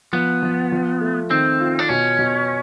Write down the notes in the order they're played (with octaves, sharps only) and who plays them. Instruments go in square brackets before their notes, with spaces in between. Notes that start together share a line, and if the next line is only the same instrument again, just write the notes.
[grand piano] F3 [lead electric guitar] B3
[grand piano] F3
F3
A3
[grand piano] D#3 [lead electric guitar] C4
[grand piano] F4
[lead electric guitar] D4
[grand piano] B2 [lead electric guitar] C#4
[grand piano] B2